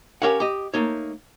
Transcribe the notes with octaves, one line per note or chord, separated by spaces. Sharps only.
C#4 G4 A#4 C#5 F5 F#5
G4 D#5
A3 A#3 D#4 C#5